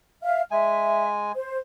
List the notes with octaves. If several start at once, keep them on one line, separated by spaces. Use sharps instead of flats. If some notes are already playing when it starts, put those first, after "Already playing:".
E5 F5 F6
G#3 E5 G#5
C5